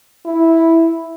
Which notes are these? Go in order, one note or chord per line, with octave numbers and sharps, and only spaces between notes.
E4